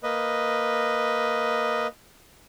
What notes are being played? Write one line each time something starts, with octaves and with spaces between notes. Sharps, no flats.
A#3 B4 D#5